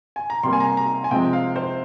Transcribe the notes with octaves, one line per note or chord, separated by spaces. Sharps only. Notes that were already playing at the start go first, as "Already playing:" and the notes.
G#5
A#5
C3 G3 A#3 C6
G#5
A#5
A#5
G#5
C3 F3 G#3 C4 G5
F5
C5